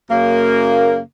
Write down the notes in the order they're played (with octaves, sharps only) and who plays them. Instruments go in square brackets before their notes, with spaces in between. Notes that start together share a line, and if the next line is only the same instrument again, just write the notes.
[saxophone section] F#2 C#3 A#3